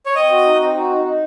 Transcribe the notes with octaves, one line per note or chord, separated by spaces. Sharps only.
C#5
C4 D#5
F#4
D#4
C4
F#4
D#4
D#4